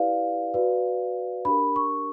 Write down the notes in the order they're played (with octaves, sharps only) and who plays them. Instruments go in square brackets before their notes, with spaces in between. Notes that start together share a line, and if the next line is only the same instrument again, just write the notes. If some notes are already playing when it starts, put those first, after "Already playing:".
Already playing: [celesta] E4 G4 B4 D5 F5
F#4 B4 D5
D4 G4 A#4 B5
C#6